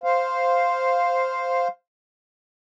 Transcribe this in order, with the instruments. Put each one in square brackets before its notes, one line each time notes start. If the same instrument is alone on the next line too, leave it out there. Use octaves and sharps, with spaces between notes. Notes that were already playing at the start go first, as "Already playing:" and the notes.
[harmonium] C5 F5